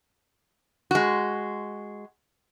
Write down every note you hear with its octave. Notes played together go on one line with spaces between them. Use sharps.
G#3 F#4